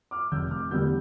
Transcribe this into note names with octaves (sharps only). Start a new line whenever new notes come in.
D6 F6
F1 E6 G6
D6 F6
E2 D3 G3 E6 G6